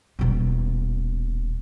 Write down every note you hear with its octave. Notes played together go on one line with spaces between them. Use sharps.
D#1 B2